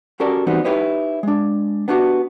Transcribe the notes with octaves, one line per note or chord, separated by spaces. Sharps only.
C#4 F#4 G4 A4 A#4 D5
E3 G3 B3 C4 D#4 F#4
D#4 E4 G4 B4 C#5 D#5
G#3 D4
B3 D4 D#4 F#4 G4